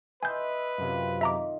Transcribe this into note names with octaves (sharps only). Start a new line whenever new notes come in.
B4 D#5 E5 G#5 C6 G6
F#2 C3 F4
D#3 E5 A#5 D6